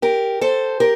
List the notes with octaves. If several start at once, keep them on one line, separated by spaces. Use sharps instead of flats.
G4 A#4
A4 C5
G4 A#4